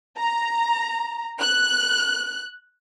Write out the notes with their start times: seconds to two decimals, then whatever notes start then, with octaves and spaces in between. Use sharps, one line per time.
0.18 A#5
1.40 F#6